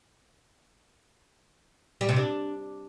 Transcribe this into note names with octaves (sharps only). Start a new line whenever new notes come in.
G3
C3
D4